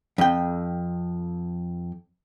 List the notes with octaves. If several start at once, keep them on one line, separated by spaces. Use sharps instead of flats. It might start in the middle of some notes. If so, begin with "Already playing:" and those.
F2 G5